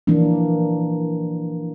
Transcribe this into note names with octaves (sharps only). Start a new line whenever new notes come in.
E3 F3 A#3 D4